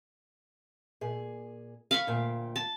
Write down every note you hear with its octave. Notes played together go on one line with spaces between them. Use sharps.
A#2 G#4
F5 B5 C#6
D2 A#2 G5
A5